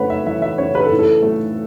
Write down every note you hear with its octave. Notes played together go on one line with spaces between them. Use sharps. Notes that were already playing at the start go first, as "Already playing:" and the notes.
Already playing: C#3 A3 B4 C#5 F#5
E5
E3 E5
E5
C#3 C#5
B4
A4
A2
A4
A3